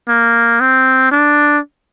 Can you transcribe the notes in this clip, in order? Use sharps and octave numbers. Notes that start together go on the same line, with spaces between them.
A#3
C4
D4